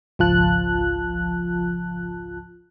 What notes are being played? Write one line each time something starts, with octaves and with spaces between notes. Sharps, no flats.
G#1 C#2 F3 F4 A5 F#6